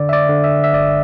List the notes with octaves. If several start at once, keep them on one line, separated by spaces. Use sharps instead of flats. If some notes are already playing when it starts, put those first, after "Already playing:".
Already playing: D3 D5
E5
D5
D3
E5
E5
G1 D5